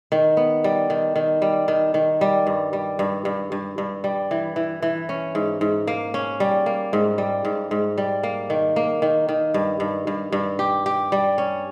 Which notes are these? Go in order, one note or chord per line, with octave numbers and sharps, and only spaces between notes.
D#3
B3
G3
D#3
D#3
G3
D#3
D#3
G3
G2
G3
G2
G2
G2
G2
G3
E3
E3
E3
C#4
G#2
G#2
A#3
C#4
G3
A#3
G#2
G3
G#2
G#2
G3
A#3
D#3
A#3
D#3
D#3
G2
G2
G2
G2
G4
G4
G3
C#4